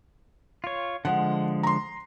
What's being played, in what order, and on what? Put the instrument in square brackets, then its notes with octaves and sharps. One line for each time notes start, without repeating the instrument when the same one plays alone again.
[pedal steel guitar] F4 C#5
[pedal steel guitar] D3 F3 G#3 [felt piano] F#5
[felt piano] A#5 C6